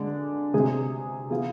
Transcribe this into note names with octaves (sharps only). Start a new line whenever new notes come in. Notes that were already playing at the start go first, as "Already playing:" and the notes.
Already playing: D3 G#3 D4
C3 G#3 C4 G#4
E3 B3 F4 G#4